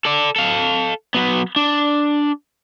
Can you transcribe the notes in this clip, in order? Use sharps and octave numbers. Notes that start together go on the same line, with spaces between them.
A4 D5
A4 F5
F#3 B3
D4